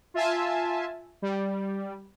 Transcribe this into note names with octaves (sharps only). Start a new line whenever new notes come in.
F4 E5 G#5 A5
G3